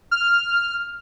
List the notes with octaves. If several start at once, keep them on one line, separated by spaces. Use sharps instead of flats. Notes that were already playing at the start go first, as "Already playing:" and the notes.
F6